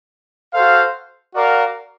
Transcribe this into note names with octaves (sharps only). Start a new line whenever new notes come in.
F#4 A4 C5 F5
F#4 A#4 D5 F5